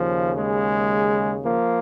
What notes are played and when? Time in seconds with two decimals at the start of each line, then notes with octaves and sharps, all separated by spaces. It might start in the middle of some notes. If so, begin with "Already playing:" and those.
Already playing: D#2 C#3 F3
0.39 G#3
1.45 F3 A#3